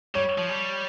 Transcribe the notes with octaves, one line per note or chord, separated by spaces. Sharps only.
G3 C#5
F3
G3